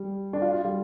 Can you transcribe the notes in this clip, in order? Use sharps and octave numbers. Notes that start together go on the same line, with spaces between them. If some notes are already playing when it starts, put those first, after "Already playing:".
Already playing: G3
D4
F4
F4
G3